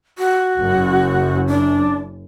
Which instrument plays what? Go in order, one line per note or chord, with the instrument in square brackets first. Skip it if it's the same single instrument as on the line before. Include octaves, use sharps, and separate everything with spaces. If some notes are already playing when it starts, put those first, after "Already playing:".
[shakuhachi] F#4
[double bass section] F#1 F#2
[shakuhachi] D4